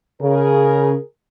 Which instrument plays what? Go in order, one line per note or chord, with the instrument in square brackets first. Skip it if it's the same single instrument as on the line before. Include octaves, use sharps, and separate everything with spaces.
[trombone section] C#3 [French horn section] G#4 A#4